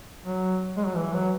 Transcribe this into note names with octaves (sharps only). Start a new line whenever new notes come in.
F#3
G#3
F#3
E3
F#3